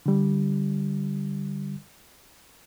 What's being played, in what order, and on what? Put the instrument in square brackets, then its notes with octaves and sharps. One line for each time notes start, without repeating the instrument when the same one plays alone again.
[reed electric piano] D3 G3